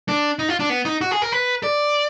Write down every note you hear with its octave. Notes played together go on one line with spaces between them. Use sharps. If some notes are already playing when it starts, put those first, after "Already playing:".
D4
D#4
F4
D4
B3
D#4
F#4
G#4
A#4
B4
D5